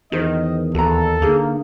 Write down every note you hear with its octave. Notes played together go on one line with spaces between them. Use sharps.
E2 D#3 F#4 A#4 C5 D#5
D#2 F#4 A4 A#5
D3 A#3 D#4 G#4